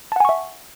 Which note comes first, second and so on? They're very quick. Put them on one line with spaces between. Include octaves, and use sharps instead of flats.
A5 F#5 G#5 C#6 E5